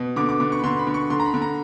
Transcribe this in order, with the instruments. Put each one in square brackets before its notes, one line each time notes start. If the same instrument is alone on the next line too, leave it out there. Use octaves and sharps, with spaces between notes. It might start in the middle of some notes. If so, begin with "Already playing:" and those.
Already playing: [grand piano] B2
D3 D6
D6
D3 D6
C#6
B5
D3 C6
B5
D3
C#6
D3 C6
A#5
B5
D3
A#5